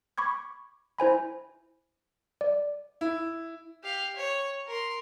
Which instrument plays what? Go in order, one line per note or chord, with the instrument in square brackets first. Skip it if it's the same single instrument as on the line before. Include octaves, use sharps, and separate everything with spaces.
[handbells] B5 C#6 D6 G#6
E4 C5 G#5 B5
D5
[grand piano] E4
[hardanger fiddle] G4 F5
C#5
A#4 C6